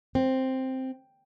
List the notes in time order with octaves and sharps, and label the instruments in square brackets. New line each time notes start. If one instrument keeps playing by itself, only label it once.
[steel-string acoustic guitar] C4